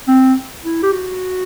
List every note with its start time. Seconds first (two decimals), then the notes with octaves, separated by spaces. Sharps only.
0.08 C4
0.64 E4
0.83 G4
0.93 F#4